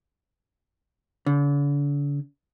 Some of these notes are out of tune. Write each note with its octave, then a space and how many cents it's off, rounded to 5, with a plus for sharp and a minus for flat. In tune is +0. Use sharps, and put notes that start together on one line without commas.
D3 -45